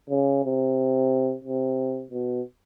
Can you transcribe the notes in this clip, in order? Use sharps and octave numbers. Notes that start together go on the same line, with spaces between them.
C#3
C3
C3
B2